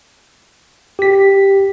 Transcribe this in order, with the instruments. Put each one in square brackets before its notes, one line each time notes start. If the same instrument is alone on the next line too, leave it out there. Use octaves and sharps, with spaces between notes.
[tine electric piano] G4 B6